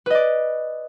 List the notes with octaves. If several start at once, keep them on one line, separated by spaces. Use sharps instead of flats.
B4 D5 D#5